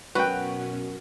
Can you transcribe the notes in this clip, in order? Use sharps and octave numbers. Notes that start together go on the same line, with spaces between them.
F#2 B2 C#4 F#4 A#4 B4 G5